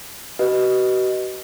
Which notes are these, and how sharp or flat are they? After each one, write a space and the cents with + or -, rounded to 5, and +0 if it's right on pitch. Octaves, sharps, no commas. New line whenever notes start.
F#4 +40 B4 +0 D#5 +0